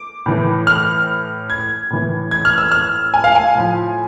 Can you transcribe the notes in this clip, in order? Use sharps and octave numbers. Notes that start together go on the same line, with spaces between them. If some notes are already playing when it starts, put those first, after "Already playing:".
Already playing: D6
A2 E3
F6
G#6
A2 E3
G#6
F6
E6
F6
G#5
F5
G#5
A2 F3